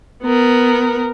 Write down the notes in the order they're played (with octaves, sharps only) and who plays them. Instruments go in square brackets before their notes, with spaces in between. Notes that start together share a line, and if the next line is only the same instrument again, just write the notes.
[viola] B3 A#4